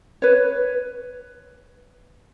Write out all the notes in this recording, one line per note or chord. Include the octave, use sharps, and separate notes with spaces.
B4 C#5